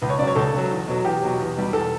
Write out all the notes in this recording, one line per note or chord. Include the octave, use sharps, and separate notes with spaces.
C#2 B4
C#5
C#3 F#3 D5
C#5
C#2 A4
C#3 F#3
E2
B2 F#3
E2 G4
B2 F#3
E2
B2 G3
E2 A4